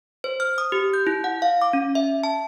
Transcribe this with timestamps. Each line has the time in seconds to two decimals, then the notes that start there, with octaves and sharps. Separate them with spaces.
0.24 C5
0.40 F6
0.58 D#6
0.72 G4
0.93 G6
1.07 E4
1.24 F#5
1.42 F5
1.62 D6
1.73 C#4
1.95 E5
2.24 A5